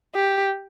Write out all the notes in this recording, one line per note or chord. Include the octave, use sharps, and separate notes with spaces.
G4